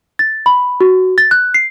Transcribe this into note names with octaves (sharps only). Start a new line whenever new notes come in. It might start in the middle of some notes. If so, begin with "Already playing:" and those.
A6
B5
F#4
A6
F#6
C7